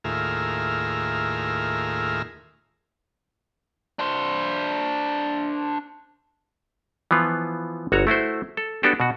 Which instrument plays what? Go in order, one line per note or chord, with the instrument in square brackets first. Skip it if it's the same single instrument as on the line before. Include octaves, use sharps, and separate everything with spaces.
[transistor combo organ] D#2 A2 F4 G#4 A#4 E5
[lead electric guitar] D4 C5
[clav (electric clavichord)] E3 F3 B3 F4
G1 F#4 C#5 A#5
A3 E4 F#4 C5
A4
B3 D4 F#4 G4 A4
B2 F#4